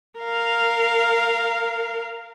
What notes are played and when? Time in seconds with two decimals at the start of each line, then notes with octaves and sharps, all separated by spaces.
0.20 A#4 F5